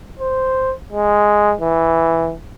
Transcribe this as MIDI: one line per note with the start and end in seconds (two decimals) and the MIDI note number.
0.19 0.73 72
0.93 1.54 56
1.61 2.34 52